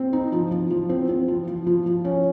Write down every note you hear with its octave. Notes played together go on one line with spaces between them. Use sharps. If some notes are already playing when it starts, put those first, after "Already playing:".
Already playing: C4
D#4
F3
F3
F3
C4
C4
F3
F3
F3
F3
C#4